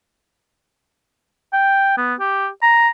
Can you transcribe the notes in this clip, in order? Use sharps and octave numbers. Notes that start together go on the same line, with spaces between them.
G5
B3
G4
A#5